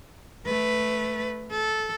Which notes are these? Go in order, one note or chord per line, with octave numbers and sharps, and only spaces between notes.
A3 B4
A4